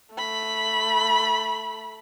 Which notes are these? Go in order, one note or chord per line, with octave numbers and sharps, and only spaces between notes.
A3 B5